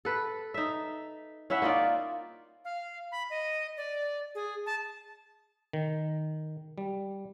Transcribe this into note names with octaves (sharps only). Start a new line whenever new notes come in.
A4 B4
D#4 E5
C#4 E4 E5 F#5
A#3 D#4 F4 D5
F5
B5
D#5
D5
G#4
A5
D#3
G3